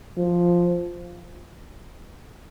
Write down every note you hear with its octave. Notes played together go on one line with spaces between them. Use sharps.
F3